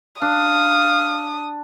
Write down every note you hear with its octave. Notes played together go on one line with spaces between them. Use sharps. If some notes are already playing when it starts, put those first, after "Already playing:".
D4 F5 D#6